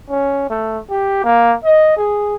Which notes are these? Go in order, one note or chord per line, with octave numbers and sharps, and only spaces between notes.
C#4
A3
G4
A#3
D#5
G#4